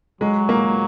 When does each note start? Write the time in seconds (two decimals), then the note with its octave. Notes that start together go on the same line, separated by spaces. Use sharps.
0.21 F#3 G#3
0.49 A#3